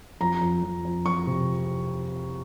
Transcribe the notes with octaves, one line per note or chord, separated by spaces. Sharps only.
F2 A#5
F2
F2
F2
F2 C#6
C3